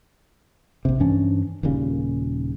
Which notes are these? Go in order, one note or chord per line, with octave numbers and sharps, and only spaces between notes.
A#1 C3
G2 E3 C#4 D4
D#1 D#2 A#2 C#3